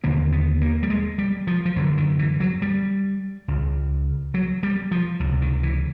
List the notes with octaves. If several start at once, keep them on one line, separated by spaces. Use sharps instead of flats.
D#2 D3 A#3
B3
A#3
G3
G#3
G3
F3
F3
F#2 D3 F#3
D#3
E3
F#3
G3
C#2 C#3
F#3
G3
F3
C#2 C3 D3
D#3
E3